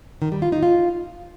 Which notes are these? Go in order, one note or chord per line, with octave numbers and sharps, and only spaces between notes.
D#3
G3
F4
D#4
F4